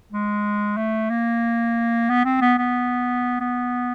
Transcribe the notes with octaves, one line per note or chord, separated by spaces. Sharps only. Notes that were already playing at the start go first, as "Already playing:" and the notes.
G#3
A3
A#3
B3
C4
B3
B3
B3